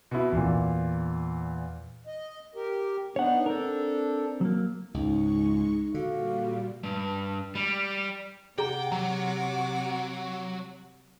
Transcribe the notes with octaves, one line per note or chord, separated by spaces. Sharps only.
B2 E4
E2 A#2
D#5
G4 A#4
B3 D4 D#4 C#5 F#5
C4 D4 A4 A#4
F#3 A#3
C#2 G#2 G#3 D#4 C#6
A#2 D3 G3 F#4 F5
G2
G3
C3 G#4 F#5 G5 A#5 D6
F#3 A#5